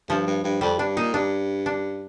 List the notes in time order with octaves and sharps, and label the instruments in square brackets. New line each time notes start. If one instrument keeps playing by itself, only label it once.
[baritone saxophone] G2 [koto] F3
[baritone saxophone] G2
G2
[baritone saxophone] F2 [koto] G3
[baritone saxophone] G2 [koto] D4
[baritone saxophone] A#2 [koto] D#4
[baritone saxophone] G2 [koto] D4
[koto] D4